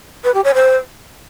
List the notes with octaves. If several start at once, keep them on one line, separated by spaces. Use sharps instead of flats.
B4
G4
C#5
C5